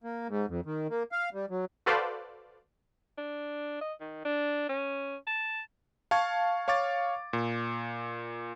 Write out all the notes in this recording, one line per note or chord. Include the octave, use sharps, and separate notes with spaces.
A#3
G#2
F2
D#3
A#3
F5
G3
F#3
F#4 A4 B4 C5 D5 F5
D4
D#5
D#3
D4
C#4
A5
F5 A5 C#6 G#6
C#5 F5 C#6 D6 A6
A#2